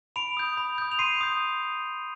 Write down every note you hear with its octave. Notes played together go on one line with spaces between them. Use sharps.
B5 D7 F7
D#6 G6
B5
D#6 G6
F7
C6 C7 D#7
D#6 G6